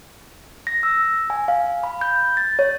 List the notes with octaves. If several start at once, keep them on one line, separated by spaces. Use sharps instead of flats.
A#6
E6
G#5
F5
B5
G6
A6
C#5